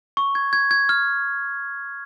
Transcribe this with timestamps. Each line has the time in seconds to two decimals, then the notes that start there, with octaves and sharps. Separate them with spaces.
0.17 C#6
0.35 G#6
0.53 G#6
0.71 G#6
0.89 F6